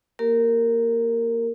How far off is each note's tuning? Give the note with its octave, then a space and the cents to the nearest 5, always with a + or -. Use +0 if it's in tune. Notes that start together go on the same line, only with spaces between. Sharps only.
A#3 +0 G4 -25 A#4 -15